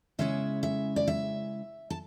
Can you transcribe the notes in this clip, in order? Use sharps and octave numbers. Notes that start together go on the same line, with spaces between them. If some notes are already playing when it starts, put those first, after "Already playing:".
C#3 G#3 C#4 E4 E5
E5
D5
E5
A5